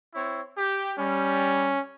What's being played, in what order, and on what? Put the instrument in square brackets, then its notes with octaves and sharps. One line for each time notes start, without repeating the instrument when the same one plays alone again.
[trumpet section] C4 E4 C#5
G4
[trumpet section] G3 [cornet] C#4